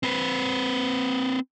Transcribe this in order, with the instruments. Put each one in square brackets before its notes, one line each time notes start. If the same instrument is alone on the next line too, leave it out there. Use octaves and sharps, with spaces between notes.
[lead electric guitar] C4 B4